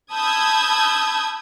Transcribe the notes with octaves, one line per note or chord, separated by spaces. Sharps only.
A5 B5 D#6 E6 G6 G#6